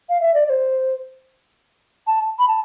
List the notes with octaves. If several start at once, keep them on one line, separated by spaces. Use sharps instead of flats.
F5
E5
D5
D5
C5
A5
B5
A5